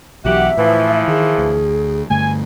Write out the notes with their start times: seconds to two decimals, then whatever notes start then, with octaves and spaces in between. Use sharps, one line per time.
0.25 B1 E3 F#3 F#4 G4 E5 F#5
0.57 A2 E3 F3
1.08 D#3 G#4
1.38 D2
2.10 G2 D3 A3 G#5